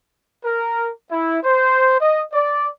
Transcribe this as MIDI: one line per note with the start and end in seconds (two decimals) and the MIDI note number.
0.45 0.89 70
1.11 1.38 64
1.43 1.99 72
2.01 2.21 75
2.33 2.68 74